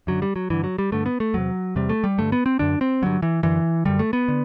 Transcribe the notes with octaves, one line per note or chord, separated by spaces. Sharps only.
F#2 D3 F#3
G3
F#3
G2 D3 E3
F#3
G3
G2 D3 A3
B3
A3
E2 C3 F#3
E2 C3 G3
A3
G3
G2 D3 A3
B3
C4
F#2 D3 D4
C4
G2 D3 F#3
E3
F#2 D3 E3
F#2 D3 G3
A3
B3
D3